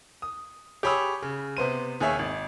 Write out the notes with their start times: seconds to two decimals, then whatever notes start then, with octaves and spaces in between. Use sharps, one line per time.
0.22 D#6
0.83 G4 G#4 C#5 B5 D#6 E6
1.22 C#3
1.57 C3 B3 C5 D#7
2.01 D#2 G#4 C#5 E5
2.19 G#1